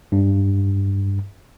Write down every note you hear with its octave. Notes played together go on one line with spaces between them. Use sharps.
G2